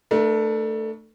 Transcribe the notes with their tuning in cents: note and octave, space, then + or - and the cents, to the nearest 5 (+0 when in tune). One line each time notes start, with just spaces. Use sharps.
A3 +10 D4 +30 B4 -45